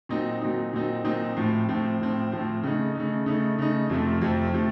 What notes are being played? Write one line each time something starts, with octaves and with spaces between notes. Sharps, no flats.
A#2 F#3 C4 D#4
A#2 F#3 C4 D#4
A#2 F#3 C4 D#4
A#2 F#3 C4 D#4
A2 F3 C4
A2 F3 C4
A2 F3 C4
A2 F3 C4
C#3 A3 D#4
C#3 A3 D#4
C#3 A3 D#4
C#3 A3 D#4
F2 C3 F3 A3 C4
F2 C3 F3 A3 C4
C3 F3 A3 C4